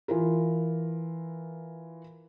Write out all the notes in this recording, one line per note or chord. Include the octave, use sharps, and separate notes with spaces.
E3 F4 A#4